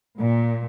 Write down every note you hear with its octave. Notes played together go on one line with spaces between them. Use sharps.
A#2